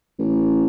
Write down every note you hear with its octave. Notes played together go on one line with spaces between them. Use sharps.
A1